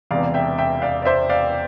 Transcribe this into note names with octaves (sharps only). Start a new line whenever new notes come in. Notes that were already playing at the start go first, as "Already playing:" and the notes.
E1 E2 C3 D5 F5
E5 G5
E5 G5
D5 F5
D5
C5 E5
D5 F5